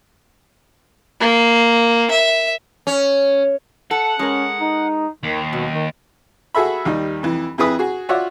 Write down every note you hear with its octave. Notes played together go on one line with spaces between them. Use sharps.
A#3
E5
C#4
A4 F#5
G#3 C#4 A#4
D#4
D#2 D#3
F#2 B2
D#3
F#4 G#4 A4 E5 B5
D#2 G3 D#4
F2 E3
F2 E4 G#4 B4 D#6
F#4 G#4
F4 F#4 C#5 D5 E5 F#5